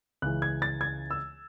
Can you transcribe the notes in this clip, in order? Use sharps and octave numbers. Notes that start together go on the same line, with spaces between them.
C#2 C#3 E3 F#6
G#6
A6
G#6
E6